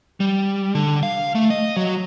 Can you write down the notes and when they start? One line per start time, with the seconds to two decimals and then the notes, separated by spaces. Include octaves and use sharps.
0.20 G3
0.75 D3
1.03 F5
1.35 A3
1.50 D#5
1.76 F#3